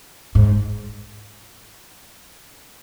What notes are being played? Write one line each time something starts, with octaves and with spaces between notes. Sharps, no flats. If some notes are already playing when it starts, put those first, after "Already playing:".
G#2